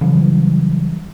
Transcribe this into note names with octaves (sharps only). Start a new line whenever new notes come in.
C#3 E3 F#3 G3